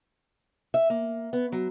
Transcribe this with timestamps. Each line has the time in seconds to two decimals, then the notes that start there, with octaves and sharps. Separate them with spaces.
0.74 E5
0.90 A#3
1.33 B3
1.52 F#3